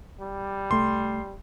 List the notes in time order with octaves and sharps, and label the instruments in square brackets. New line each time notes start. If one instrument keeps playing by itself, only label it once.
[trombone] G3
[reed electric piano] C2 A3 [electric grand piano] C6